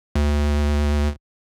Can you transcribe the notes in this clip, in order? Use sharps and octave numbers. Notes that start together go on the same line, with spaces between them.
D2